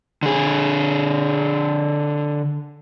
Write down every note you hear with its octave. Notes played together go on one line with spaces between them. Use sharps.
D3 G#4